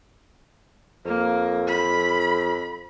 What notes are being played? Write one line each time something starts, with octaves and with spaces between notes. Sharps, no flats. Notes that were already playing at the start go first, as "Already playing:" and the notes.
F2 A#3
B5